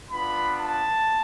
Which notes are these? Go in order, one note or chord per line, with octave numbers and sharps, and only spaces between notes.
B3 D4 F4 B5
A5